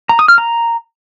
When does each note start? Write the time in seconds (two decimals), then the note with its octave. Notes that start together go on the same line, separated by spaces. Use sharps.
0.09 A#5
0.19 D#6
0.28 F6
0.38 A#5